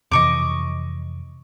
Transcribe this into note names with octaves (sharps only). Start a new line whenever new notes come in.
F2 C3 E3 D#5 C#6 D6